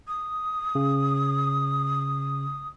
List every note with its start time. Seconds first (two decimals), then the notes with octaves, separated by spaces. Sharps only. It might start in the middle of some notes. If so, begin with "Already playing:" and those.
0.08 D#6
0.75 C#3